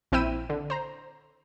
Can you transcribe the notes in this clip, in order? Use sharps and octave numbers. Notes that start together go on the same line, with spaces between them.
A#1 C4 E4 G5 E6 D#7
D3
C5 A#5